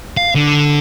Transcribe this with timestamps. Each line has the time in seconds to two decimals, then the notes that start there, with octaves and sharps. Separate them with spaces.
0.17 F5
0.35 D3